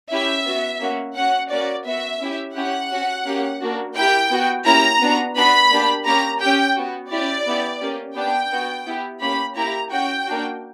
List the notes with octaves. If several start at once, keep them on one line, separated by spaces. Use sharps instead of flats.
C#4 E4 G4 E5
B3 F#4
A#3 C#4 F#4
C#4 F#4 F#5
A#3 C#4 F#4 D5
B3 F#4 E5
C#4 E4 G4
C#4 E4 G4 F#5
C#4 F#4
A#3 C#4 G4
A#3 D4 F#4
A#3 E4 G4 G5
B3 F#4
A#3 C#4 E4 G4 A#5
B3 D4 F#4
B3 D4 F#4 B5
A#3 D4 G4
A#3 C#4 G4 A#5
C#4 G4 G5
B3 F#4
C#4 E4 G4 D5
B3 E4 G4
A#3 C#4 G4
B3 D4 G4 G5
B3 F#4
B3 E4 G4
A#3 C#4 G4 B5
A#3 E4 G4 A#5
C#4 F#4 G5
A#3 D4 F#4